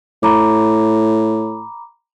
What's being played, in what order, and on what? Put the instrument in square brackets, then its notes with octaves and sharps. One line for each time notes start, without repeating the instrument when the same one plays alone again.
[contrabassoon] A2 [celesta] A#5 B5 D6